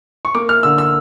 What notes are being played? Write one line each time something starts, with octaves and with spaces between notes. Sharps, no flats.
C#6
A#3 D6
F6
D3 E6
E6